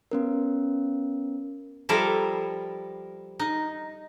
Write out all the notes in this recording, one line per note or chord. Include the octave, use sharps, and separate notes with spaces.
B3 C#4 A#4
F3 G3 E4 A4 A#4 F5
D#4